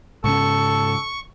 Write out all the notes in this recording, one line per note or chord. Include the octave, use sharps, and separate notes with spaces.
G#2 C#3 C#4 A4 C#6